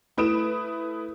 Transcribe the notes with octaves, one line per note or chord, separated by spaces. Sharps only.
A3 E4 B4 D#6 D7 E7